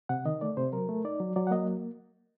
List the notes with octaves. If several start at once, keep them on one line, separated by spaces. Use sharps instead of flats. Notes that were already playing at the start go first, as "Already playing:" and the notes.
C3 F#5
D#3 D#5
A3 D5
C3 C5
F#3 A#4
A3
D#4 D5
F#3
F#3 D5
F#5
A#3 D#5